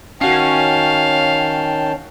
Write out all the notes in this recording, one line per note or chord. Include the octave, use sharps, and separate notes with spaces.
D#3 C#4 F#4 F5 G5 A5 C7